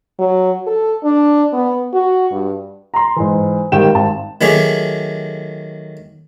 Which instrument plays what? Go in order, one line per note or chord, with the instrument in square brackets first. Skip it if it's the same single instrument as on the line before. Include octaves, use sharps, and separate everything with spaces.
[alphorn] F#3
A4
D4
B3
F#4
G2
[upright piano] A#5 C6
G#2 E3
G#1 D#3 G3 G5 E7
G#1 A5
[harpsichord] D#3 F#3 A3 G4 G#4